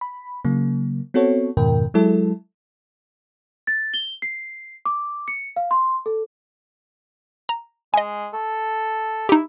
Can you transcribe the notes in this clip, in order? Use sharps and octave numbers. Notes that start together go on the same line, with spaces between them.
B5
C#3 F#3 A#3
B3 C4 F#4 A4 C#5
F2 G#2 B2 D#3 A#4 G5
F#3 G#3 E4 A4
A6
G7
C7
D6
C#7
F5
C6
A4
A#5
G#3 D#5 G#5
A4
D#4 E4 G4